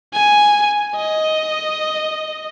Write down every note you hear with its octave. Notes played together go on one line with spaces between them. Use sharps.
G#5
D#5